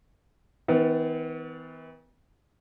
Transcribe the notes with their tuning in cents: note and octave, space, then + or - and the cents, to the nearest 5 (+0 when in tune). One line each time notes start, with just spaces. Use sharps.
E3 -45 B3 +30